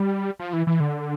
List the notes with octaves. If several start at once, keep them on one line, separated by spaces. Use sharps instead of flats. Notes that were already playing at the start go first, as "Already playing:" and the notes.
Already playing: G3
F3
E3
E3
D3